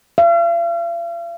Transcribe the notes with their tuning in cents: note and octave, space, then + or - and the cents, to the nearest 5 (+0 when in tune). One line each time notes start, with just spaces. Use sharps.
F5 -45